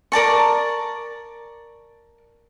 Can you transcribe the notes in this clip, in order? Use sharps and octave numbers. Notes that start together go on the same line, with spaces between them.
A#4 D5 A5 C#6